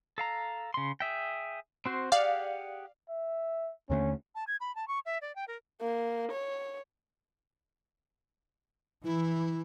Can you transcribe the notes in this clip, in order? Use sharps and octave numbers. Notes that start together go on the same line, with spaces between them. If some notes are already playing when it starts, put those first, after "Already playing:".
A4 F5 A#5
C#3 C6
G#4 E5 G5
C4 F#4 C5
G4 G#4 D5 F5 F#5
E5
D#2 D3 A3 C#4
A5
G#6
B5
A5
C#6
E5
D5
G5
A#4
A#3
C#5
E3 E4